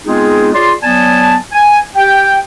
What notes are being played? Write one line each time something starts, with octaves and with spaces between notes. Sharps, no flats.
G#3 B3 C4 D#4 F4 G#4
F4 G#4 C#5 D5 C6
F#3 B3 D5 G#5 A5
G#5
G4 G5